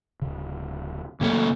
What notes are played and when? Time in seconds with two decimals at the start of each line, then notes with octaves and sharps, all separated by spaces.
0.22 D1 C#3
1.21 C#3 F#3 A3 A#3 A4